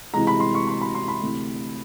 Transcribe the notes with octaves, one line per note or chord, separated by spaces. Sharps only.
C#2 C3 E3 G#3 A#5
B5
C6
C#6
C6
B5
C6
B5
D2 C3 E3